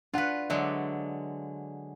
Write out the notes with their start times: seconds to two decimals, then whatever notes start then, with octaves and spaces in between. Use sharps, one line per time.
0.14 D4 F4 B4 F#5
0.50 D3 F#3 G#3 D5 E5